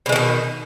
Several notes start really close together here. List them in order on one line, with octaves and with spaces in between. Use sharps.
B2 G#3 E3 D#3